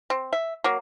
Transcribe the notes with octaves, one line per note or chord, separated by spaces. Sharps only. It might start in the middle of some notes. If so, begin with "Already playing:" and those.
C4
E5
F#3 A#3